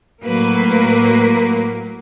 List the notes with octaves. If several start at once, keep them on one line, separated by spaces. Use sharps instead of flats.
A2 F#3 A#3 B4